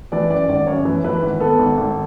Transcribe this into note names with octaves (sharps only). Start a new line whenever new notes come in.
E3 D5
F#2 D5
G#1 D5
F#2 C#5
E3
E3 B4
G#1
B3 A4
G#1
G#1